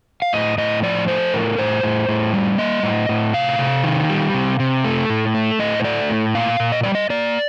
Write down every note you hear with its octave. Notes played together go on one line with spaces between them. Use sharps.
F5
A2 D#5
A2 D#5
F3 D5
A3 C5
A2 A#4
A2 C5
A2
A2
G3
A#3 D#5
A2
A2
C3 F5
C3
D#3
G3
C3
C3
A3
A2
A3
A2 D#5
C5
A3 D5
A2
A#2 F5
A#2
D#5
G3 D5
D#5
A#3 D5